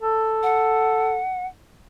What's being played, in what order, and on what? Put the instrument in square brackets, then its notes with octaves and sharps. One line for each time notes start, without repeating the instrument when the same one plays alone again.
[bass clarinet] A4
[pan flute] F#5